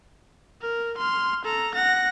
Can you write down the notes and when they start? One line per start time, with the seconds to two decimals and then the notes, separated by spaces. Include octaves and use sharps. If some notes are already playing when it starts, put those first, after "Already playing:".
0.62 A#4
0.97 C6 F6
1.45 A4 A#5
1.74 F#5 A#6